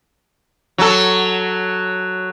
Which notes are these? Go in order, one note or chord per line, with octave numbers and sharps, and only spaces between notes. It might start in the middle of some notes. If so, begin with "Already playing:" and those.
F#3 A4